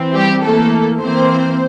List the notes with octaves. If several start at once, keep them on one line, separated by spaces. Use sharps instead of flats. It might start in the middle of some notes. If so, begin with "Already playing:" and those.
Already playing: E3 C4
G3 G4
E3 A3 A#3 A4
E3 A#3 C4 C5